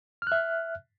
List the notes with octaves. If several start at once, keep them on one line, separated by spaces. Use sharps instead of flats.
E5 F6 F#6